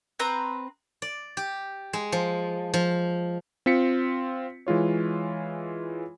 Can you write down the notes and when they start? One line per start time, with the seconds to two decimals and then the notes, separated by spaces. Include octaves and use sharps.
0.19 C4 B4 A#5
1.02 D5
1.37 G4
1.93 G#3
2.12 F3
2.74 F3
3.66 C4 F4 B6 C#7
4.67 E3 G#3 F4 C#5